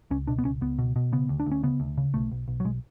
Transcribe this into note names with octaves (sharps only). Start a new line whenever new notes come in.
C#2 C#4
B2 D4
B3
C#2 C#4
C#2 B3
B2
B2
C#3 B3
D2
D4
D2
C#4
C#3 B3
D2
C#3
B1 A3
B1
B1
F#3
B1 G#3